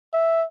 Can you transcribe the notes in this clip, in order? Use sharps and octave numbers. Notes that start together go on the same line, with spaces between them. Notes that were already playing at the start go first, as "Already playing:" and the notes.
E5